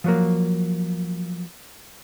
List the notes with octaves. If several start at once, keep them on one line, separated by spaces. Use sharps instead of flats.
F3 F#3 A#3